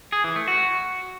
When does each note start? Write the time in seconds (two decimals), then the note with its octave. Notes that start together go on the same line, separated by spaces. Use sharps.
0.12 G#4
0.24 E3
0.36 A3
0.48 F#4